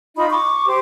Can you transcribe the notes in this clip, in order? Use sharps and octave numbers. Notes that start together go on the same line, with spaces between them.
D#4 F4 B5
C#6 D6
G4 C5